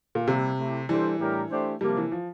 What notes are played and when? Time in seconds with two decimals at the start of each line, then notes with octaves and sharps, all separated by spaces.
0.15 A#2
0.27 C3 G3 A#3 E4
0.58 A3 E4 G4
0.89 E3 G3 D4 A4 C5
1.19 A2 G3 D4 G4 A#4
1.51 A3 D4 G4 C5
1.81 C3 F3 G3 A#3 D4
1.97 E3
2.12 F3